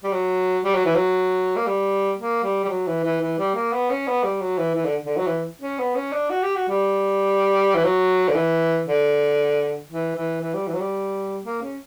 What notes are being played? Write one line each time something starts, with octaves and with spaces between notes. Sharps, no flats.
G3
F#3
G3
F#3
E3
F#3
A#3
G3
A#3
G3
G3
F#3
E3
E3
E3
G3
A#3
B3
C#4
B3
G3
F#3
E3
E3
D3
D3
F#3
E3
C#4
B3
C#4
D4
F#4
G4
F#4
G3
E3
F#3
D3
E3
D3
E3
E3
E3
G3
E3
F#3
G3
A#3
C#4